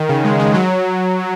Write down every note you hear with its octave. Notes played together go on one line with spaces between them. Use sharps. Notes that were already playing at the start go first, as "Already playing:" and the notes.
Already playing: D#3
C#3
G#3
G#3
F#3